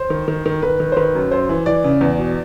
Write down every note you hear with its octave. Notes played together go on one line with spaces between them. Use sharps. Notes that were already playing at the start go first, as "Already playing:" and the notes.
Already playing: C5
D#3
D#3
D#3
D#3 B4
D#3
C5
D#3 B4
F#2
F#2 C5
E3
E3 D5
C#3
E2
B2